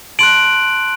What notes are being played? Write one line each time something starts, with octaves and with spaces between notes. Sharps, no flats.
A5 C6 F#6 D7 F#7